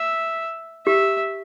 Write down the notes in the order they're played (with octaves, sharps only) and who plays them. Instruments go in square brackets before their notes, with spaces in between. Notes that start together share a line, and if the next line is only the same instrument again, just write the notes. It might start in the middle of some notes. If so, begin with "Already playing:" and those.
Already playing: [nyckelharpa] E5
[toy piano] G4 [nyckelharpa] E5